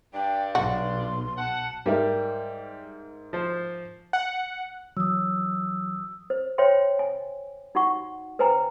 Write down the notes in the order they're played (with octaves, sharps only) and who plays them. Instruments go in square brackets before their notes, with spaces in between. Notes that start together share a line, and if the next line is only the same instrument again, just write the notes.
[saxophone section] G2 D4 [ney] G5
[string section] B1 [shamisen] F#4 [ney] C6
[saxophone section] F#5 [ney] A5
[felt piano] G#2 A#4 E5 [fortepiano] G3
[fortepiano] F3 C5
[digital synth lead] F#5
[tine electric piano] E3 F#3 [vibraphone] D#6 E6
[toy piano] C5
C5 C#5 E5 G5 C6
G#5
D#4 F#4 F#5 C#6
B4 C5 G5 G#5 A#5